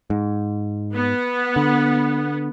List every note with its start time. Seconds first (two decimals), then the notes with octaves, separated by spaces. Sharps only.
0.10 G#2
0.94 B3
1.56 D3